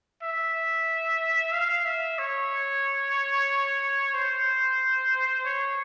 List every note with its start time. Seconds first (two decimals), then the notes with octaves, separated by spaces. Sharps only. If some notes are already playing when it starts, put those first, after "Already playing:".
0.23 E5
1.52 F5
1.85 E5
2.19 C#5
4.14 C5
5.45 C#5